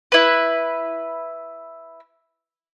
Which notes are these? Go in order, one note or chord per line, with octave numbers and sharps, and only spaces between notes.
E4 B4